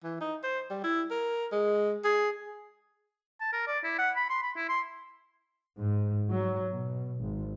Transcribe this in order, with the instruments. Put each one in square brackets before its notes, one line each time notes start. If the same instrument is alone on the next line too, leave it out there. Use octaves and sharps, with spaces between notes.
[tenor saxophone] E3
D#4
C5
G3
E4
A#4
G#3
G#4
[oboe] A5
A#4
D5
E4
F#5
B5
C6
B5
E4
C6
[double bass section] G#2
F#3
B2
G#1